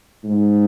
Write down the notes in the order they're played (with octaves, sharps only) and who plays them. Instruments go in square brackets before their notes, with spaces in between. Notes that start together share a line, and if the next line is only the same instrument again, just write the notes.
[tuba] G#2